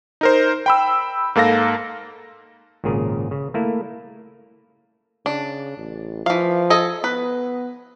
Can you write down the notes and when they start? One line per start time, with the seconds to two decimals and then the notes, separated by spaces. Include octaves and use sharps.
0.21 D#4 A#4 C5
0.66 G5 B5 E6
1.35 G#2 A#3 A4 F5 A#6
2.84 G#1 A#2 C#3 G#4 A#4
3.31 C#3
3.54 A3 A#3 E4
5.26 C#3 D4
5.77 A1
6.26 E3 F3 F5
6.70 A4 D#5 G#5
7.04 B3 B4